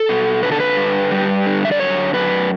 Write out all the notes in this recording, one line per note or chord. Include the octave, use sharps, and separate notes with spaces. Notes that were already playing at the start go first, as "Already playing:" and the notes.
Already playing: A4
B2
D3 B4
A4
B4
G2
G3
D3
E5
D5
F#2 C#5
F#2 B4